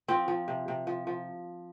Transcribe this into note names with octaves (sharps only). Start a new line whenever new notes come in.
F3 C4
F3
C3
C3
F3
F3